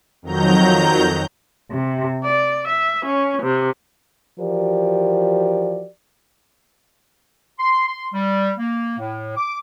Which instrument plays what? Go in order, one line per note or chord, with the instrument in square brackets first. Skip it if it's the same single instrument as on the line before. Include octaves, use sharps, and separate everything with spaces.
[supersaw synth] F2 D#3 F#3 A#5 G6
[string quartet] C3
D5
E5
C#4
C3
[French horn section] E3 F3 F#4 G4 A#4 D5
[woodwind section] C6
C6
G3
A#3
A2
D6